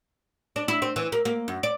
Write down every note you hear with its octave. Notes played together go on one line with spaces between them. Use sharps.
D4
E4
C4
E3
A#3
A#3
F#2
D5